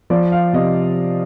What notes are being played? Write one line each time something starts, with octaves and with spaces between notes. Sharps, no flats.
F3 D5
F5
C3 D#5